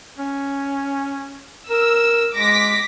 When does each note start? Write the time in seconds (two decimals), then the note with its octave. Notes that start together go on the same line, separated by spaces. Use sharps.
0.18 C#4
1.69 A#4 E6
2.35 G#3 D6 A#6 B6